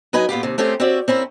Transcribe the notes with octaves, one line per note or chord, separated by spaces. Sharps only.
F#3 D#4 B4 D#5 G#5 A#5
A#2 B3 F4 G4
D#2 C3
A3 C4 C#4 G4 G#4
C4 F#4 G4 C#5 D5 E5
C4 C#4 E4 A#4